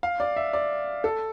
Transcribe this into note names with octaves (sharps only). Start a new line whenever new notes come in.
F5
D5
E5
D5
A4